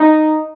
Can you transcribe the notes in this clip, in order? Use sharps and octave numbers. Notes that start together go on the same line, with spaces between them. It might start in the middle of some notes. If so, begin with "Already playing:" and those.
Already playing: D#4